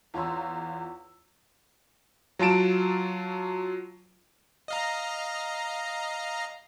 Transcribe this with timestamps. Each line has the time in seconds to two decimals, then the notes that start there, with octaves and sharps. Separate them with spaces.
0.14 E2 F4 C#5 A#5 C6 E6
2.39 F#3 F4 A5 D7 E7
4.68 D#5 F5 A#5